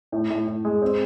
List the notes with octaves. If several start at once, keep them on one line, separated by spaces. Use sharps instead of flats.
A2
A2
A2
G#3
C4